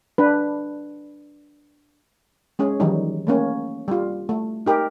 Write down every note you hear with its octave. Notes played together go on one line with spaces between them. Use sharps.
D4 B4
G#3 C#4 G#4
D#3 E3 F#3 G3 D#4
A3 A#3 C#4
G3 F4
A3
D#4 G4 A#4